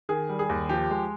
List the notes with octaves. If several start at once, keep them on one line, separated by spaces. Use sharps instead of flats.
D#3 G#4
G3
G#4
D#2
F3 G4
G#3